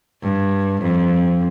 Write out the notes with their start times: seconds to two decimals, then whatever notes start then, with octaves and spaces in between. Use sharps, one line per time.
0.23 G2
0.82 F2